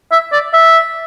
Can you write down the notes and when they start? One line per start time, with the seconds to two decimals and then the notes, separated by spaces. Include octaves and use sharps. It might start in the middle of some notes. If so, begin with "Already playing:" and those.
0.12 E5
0.32 D5
0.54 E5